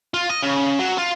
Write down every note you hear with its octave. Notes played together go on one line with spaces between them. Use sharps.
F4
D#5
C#3
F#3
F4